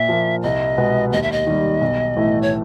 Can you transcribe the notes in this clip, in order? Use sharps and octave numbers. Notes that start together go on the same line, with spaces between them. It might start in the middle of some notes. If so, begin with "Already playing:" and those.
Already playing: A#2 E5
F3 A#3
C2 D#5
B2 G#3 B3
D#2 D#5
E5
D#5
D#3 G3
B1
A2 E3 A3
C#5